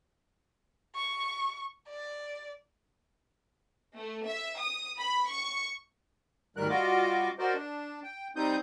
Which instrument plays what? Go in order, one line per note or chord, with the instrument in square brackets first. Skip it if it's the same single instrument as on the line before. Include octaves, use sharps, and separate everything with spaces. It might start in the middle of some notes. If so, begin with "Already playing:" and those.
[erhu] C#6
D5
[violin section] A3
E5
D#6
B5
C#6
[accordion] D2 G#2 D#3 G3 A#4 F#6
G3 F4 F#4 D#5 D6
F#4 A#4 C5 D5 D#5
D4
G5
G3 C4 D#4 D#6 G6